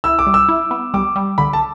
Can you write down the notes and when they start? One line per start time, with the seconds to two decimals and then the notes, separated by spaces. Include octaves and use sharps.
0.04 E4 E6
0.19 D6
0.26 G3
0.34 E6
0.49 E4
0.71 B3
0.94 G3 D6
1.16 G3
1.38 D3 B5
1.53 A5